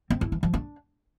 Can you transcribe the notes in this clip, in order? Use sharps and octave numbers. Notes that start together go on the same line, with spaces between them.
C4
E4
E3
F3
D4